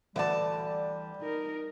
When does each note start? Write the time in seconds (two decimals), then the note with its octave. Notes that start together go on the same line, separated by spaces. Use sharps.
0.16 D2 D3 E3 G3 D5 A5
1.21 D#4 A#4